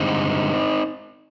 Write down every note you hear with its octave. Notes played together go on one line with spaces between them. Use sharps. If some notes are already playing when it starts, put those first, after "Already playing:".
Already playing: G2 D3 G#3 C4 D#4